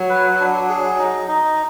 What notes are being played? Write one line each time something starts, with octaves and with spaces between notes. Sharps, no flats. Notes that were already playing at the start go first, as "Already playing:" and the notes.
Already playing: F#3
B4
D4
G#4
D#4
D#4